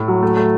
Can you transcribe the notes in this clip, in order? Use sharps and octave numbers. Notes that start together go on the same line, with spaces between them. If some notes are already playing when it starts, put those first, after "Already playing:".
Already playing: A2
F#3
A3
A3